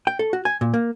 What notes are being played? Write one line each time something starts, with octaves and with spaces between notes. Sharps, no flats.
G5
A4
F#4
G#5
A#2
A#3